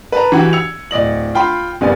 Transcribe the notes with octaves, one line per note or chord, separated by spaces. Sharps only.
B4 A5 A#5
E3 F#4 G4
E6 G#6 C#7 F7
D1 D5 D#5 F#7
F4 G5 B5 C6
F#1 G3 B3 D5 G#5